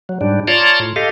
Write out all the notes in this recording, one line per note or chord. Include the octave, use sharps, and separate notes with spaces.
F#3
G#2 G3 D4
F4 C#5 D5 A5 A#5 C6
A2
G4 A4 D#5 F5